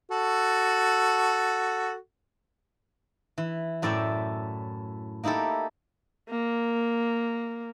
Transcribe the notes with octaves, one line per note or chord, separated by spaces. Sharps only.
F#4 A4
E3
F#2 A2 A4 D5 E5 G5
A#3 D#4 E4 G4 A4
A#3